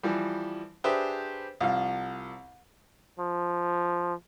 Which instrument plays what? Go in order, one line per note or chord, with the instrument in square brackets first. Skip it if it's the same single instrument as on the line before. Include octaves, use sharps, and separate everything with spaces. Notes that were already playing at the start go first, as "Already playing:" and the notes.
[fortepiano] E3 F3 G3
D4 G4 G#4 B4 C5 E5
C2 F3 F5
[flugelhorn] F3